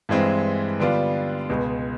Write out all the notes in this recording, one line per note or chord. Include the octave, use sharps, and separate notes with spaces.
G2 E3 G#3 C4
D3 G3 B3 D4 F4
C#2 B2 G#3 B3